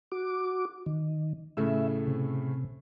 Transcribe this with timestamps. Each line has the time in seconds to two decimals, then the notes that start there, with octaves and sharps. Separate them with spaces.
0.12 F#4 D6
0.86 D#3
1.57 A2 C#3 A3 E5
2.07 C3